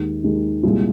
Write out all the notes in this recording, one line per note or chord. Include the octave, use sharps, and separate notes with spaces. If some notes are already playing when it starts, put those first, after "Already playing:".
Already playing: D#2 D#3 G#3
D#2 D#3 G#3
C2 A#2 G#3 F4